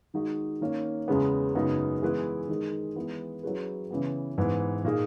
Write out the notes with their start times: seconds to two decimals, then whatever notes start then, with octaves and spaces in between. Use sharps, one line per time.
0.14 D#3 G#3 D#4 F#4
0.61 D#3 A#3 C#4
1.08 E2 C#3 G#3 B3
1.55 F#2 C#3 G#3 B3 D#4
2.02 E3 G#3 B3 E4 B4
2.48 D#3 G#3 D#4 A#4
2.96 E3 G#3 B3 E4
3.43 F#3 C#4 E4 G#4 B4
3.91 C#3 E3 B3
4.38 G#2 E3 B3 E4
4.84 A#2 A#3 D#4 G#4